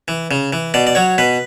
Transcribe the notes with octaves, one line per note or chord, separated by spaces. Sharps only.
E3
C#3
E3
B2 D5
D5
F#3 C#5
B2 B4